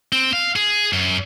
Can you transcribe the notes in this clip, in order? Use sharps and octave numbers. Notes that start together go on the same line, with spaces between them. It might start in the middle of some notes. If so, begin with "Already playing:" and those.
C4
F5
G#4
F#2